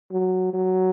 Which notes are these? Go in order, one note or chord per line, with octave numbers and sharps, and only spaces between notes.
F#3
F#3